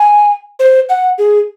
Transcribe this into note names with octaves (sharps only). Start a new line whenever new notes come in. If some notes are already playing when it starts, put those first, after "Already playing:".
Already playing: G#5
C5
F#5
G#4